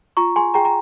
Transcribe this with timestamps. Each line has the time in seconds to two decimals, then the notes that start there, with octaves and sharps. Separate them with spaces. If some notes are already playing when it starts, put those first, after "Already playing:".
0.17 F4 A#5 C#6
0.36 G#4 G#5 C6
0.54 G#4 G5 A#5
0.65 A#5